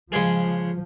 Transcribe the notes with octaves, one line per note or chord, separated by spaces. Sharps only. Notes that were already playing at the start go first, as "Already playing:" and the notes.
C#3 F3 G#3 G#4